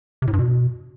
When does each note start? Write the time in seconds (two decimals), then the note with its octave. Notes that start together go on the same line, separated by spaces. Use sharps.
0.22 C3
0.28 A2
0.33 G2
0.39 B2